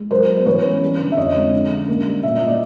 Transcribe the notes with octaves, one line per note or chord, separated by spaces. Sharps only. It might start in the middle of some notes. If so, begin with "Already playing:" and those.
Already playing: G#3
F#3 A#4 C5
B3
C5
E3 B4 C#5
C#4
G3
D3
E5
F2 C#5 D#5
G#3
D3
C#4
A#3
G3
A#2 E5
D#5
A#2
D5 E5